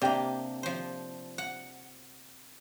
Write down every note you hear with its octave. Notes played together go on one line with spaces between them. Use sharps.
C3 A#3 D4 G4
F3 C5
F#5